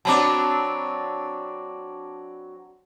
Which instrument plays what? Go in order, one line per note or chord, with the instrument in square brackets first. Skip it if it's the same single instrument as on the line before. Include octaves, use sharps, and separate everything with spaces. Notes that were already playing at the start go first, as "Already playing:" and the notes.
[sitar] F#3 C4 D4 [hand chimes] A5 B5 D6